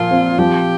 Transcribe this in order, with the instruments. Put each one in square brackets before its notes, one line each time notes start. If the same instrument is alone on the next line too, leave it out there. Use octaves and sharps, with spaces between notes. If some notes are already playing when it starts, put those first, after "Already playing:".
Already playing: [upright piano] A#2 F3 [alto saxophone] F4
[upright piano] C4
[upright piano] F3 [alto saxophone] G4